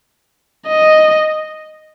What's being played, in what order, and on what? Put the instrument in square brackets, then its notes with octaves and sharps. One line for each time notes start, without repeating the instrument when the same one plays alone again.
[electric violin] D#5